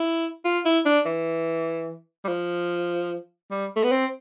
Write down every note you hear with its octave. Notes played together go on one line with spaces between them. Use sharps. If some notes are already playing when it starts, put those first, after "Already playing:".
Already playing: E4
F4
E4
D4
E3
G3
F3
G3
A3
B3
C4